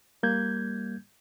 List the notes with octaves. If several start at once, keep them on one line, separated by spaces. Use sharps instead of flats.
G3 A#3 G6 G#6